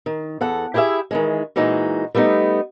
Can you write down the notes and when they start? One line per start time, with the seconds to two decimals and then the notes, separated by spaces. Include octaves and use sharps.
0.06 D#3
0.41 E2 A4 F#5
0.74 E4 G4 G#4 C5 E5
1.11 D#3 E3 G#3
1.56 A#2 E3 G#3 D#4 F#4
2.15 G3 A3 B3 C#4 D#4